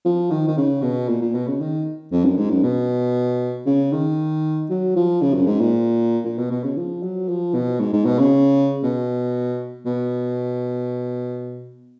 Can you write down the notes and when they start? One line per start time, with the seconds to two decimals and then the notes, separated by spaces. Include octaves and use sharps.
0.05 F3
0.31 D#3
0.48 D#3
0.58 C#3
0.82 B2
1.08 A#2
1.22 A#2
1.35 B2
1.47 C#3
1.61 D#3
2.12 F2
2.25 F#2
2.38 G#2
2.50 F#2
2.63 B2
3.67 C#3
3.93 D#3
4.70 F#3
4.96 F3
5.22 C#3
5.34 F#2
5.47 G#2
5.61 A#2
6.25 A#2
6.38 B2
6.51 B2
6.64 C#3
6.77 F3
7.03 F#3
7.29 F3
7.55 B2
7.80 G#2
7.93 G#2
8.06 B2
8.19 C#3
8.84 B2
9.86 B2